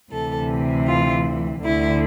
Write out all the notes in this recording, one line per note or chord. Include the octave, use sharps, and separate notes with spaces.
D2 C3 E3 A4
F4
D2 D3 E4